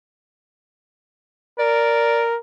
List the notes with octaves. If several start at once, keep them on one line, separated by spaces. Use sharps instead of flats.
A#4 D5